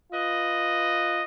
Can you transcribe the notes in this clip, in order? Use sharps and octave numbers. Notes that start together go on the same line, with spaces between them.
F4 B4 D#5